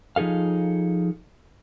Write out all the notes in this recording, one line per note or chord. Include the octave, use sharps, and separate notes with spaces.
F3 D#4 G#4 A4 F5